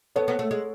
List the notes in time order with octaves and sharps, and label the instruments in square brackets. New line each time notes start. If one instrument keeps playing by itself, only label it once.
[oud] B3 [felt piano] A4 C#5
[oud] B3
A3
G#3